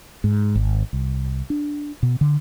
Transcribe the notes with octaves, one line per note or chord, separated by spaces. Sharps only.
G#2
G#1
C2
D4
B2
D3